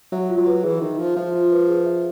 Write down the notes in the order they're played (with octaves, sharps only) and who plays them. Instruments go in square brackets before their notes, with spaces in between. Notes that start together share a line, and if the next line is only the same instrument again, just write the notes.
[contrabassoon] F#3 [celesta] E5
[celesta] F4
[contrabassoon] F#3
[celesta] B4
[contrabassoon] E3 [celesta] G#4
[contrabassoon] D#3 [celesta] E5
[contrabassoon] F3 [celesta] F4
[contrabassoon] F3 [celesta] E5
[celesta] F4
B4
G#4
E5